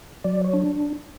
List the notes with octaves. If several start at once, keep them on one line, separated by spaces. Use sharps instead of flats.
F#3 D5
C#5
D4